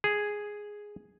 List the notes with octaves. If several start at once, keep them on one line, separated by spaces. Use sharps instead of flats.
G#4